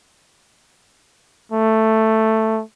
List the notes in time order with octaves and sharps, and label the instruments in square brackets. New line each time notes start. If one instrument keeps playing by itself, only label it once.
[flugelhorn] A3